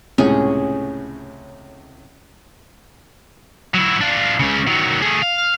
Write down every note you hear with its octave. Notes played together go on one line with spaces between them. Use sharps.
C#2 A2 C3 C#4 G#4
F#3 E4
D4 F4
C#2 C#3
D#3 F#3
A3 G#4
F5